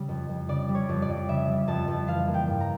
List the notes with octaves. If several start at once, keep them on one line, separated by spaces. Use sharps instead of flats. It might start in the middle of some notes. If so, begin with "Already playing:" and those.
Already playing: C#3 G3
F2
F2
C#3 D5
G3
C#5
F2
D5
F2
C#3 E5
G3
F2 A5
F2
E3 F5
A#3
G5
G2
A#5